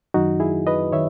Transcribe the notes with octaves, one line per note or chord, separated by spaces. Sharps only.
F#2 D#3 F#3 D#4 F#4
E4 G#4
B4 D#5
D#3 C#5 E5